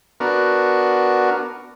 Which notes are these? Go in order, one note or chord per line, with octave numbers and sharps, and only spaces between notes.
B3 D4 F#4 A#4